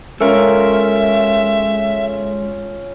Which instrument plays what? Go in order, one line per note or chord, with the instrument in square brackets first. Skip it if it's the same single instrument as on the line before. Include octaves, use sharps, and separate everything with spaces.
[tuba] G#3 [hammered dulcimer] C#4 F4 [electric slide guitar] A4 A#4 [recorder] E5